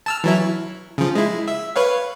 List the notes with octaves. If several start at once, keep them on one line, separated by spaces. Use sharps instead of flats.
A5 E6 F6
E3 F#3 E4
C#3 F3
G#3 E4
E5
B4 C#5 F5